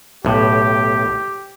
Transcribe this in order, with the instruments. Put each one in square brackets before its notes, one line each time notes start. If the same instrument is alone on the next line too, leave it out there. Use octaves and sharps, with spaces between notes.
[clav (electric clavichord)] B1 A2 [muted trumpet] G4